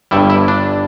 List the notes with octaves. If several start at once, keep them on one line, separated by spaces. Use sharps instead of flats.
G1 G2 G3 E4
E4
D4